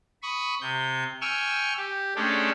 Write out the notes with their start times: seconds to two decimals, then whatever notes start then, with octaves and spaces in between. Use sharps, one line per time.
0.23 B5 C#6 D#6
0.61 C3 G6
1.21 G5 G#5 C#6 E6 F6
1.77 G4
2.16 G#3 A3 C#4 D4 G4 A4